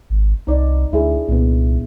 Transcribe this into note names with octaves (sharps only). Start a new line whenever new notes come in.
G#1
C2 D#4 D5
D2 D4 E4 G#4
C2 A#2 B3